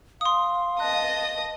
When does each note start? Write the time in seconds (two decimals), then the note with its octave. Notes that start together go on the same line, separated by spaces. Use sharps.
0.21 F5 C6 D#6
0.80 D#5 A5 D#6 F#6